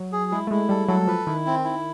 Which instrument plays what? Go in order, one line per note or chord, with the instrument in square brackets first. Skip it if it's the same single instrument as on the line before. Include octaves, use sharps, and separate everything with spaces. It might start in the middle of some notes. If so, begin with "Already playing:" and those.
Already playing: [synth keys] F#3
[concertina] G#4
[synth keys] G#3 [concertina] E4
[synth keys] A3
[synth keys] G#3 [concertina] E4
[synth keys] G3 [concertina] A4
[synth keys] F#3 [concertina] A4
[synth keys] F3 [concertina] B4
[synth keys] D#3 [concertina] E4
[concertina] C4
E4